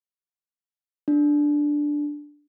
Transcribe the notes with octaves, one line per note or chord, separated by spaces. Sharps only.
D4